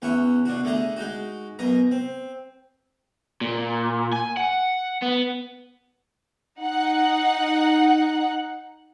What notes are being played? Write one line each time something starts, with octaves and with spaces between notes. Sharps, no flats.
E2 C#4 E4 F#5 C#6
B2 D4 F#4
D3 A3 G#4 A#5
G#3 D#4 F#4
F#2 B2 D#5 A#5
C4
A#2
G#5
F#5
B3
D#4 F#5